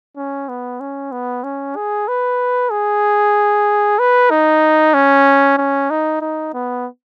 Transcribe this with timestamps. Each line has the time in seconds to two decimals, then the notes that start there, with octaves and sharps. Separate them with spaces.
0.17 C#4
0.49 B3
0.80 C#4
1.12 B3
1.44 C#4
1.76 G#4
2.08 B4
2.71 G#4
3.99 B4
4.31 D#4
4.94 C#4
5.58 C#4
5.90 D#4
6.21 D#4
6.54 B3